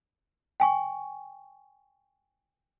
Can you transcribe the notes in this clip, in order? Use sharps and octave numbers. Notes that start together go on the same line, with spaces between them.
G5 G#5 C#6